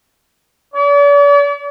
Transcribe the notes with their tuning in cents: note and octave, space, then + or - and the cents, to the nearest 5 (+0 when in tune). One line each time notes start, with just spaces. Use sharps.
D5 -45